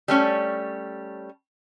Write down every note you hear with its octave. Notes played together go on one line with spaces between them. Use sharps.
G3 A3 C#4